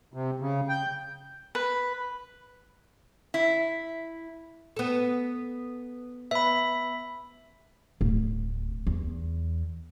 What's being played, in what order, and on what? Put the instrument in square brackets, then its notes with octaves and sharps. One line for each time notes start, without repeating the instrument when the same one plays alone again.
[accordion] C3
C#3
G5
[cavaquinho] B4
[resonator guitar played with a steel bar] E4
[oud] B3 A4
[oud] B3 [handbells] E5 B5
[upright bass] D1
E2